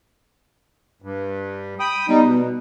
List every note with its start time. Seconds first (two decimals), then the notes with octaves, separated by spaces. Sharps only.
1.02 G2
1.80 G5 B5 D#6
2.08 G3 B3 D#4
2.25 B2